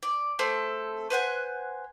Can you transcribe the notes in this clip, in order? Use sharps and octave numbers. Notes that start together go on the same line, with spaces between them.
D5
A3 C4 A4
B4 C5 F#5 G#5